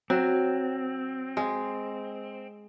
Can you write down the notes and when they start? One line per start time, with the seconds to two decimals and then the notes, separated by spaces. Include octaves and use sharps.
0.10 F#3 C4
1.37 G#3